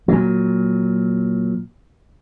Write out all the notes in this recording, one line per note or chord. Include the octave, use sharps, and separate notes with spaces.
A#2 F#3